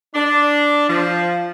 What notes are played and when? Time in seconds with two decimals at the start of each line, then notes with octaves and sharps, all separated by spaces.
0.15 D4
0.89 F3